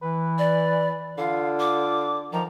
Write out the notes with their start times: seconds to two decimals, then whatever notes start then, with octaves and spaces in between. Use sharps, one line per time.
0.02 E3 B4
0.38 D5
1.18 D3 F4 F5
1.60 D6
2.33 D#3 F3 A#5